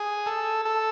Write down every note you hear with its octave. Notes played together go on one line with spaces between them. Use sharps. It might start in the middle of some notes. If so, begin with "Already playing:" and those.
Already playing: G#4
A4
A4